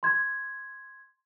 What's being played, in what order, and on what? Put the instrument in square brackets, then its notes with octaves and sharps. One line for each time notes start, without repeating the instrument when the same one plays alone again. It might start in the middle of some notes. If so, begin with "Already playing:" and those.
[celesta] C6 G#6